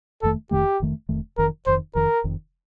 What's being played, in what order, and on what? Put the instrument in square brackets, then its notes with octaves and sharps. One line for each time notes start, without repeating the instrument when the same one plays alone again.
[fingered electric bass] F1 F2 D#3 A3 [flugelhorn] A4
[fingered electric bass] F1 F2 D#3 A3 [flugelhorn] G4
[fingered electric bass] F1 F2 D#3 A3
F1 F2 D#3 A3
[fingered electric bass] F1 F2 D#3 [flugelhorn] A#4
[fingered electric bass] F1 F2 D#3 [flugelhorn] C5
[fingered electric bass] F1 F2 D#3 [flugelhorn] A#4
[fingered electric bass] F1 F2 D#3